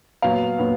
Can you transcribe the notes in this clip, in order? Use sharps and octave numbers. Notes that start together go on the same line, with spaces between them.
A#2 F#3 B3 F5
A#2 F#3 B3